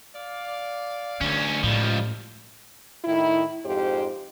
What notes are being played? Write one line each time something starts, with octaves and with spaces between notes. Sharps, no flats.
D5 F5
D2 D3 C#4
C#2 A2 F3 G3
A2 D#3 E4
F2 G#2 G4 C5